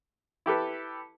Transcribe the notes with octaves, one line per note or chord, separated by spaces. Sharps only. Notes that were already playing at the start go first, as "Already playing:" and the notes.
E4 G4 A4 B4